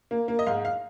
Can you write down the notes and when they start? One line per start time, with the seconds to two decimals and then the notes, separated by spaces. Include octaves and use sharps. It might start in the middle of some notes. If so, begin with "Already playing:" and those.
0.11 A#3
0.28 A#3
0.39 D#5
0.47 G#2 F5
0.65 F5